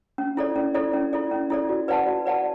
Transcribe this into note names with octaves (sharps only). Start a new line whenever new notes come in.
C#4
E4 A4 D5
C#4
E4 A4 D5
C#4
E4 A4 D5
C#4
E4 A4 D5
F#4
B4 D5 F#5 A5
F#4
B4 D5 F#5 A5